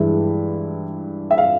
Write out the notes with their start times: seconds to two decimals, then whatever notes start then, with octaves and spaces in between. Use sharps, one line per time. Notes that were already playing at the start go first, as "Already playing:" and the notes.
Already playing: G2 E3 G#3 E4
1.31 E5
1.38 F5